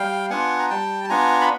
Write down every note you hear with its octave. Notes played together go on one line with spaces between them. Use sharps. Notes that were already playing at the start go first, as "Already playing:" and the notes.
Already playing: G3 F5 G5
B3 D4 F4 F#5 G#5
A#5
G3 G5 A5
A5
B3 D4 F4 G#5 A#5
B5